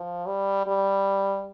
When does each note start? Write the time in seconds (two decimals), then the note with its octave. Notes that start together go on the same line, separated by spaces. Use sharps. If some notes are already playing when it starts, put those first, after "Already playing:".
Already playing: F3
0.27 G3
0.67 G3